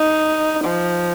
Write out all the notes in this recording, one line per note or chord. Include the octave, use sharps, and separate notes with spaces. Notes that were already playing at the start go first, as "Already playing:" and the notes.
Already playing: D#4
F3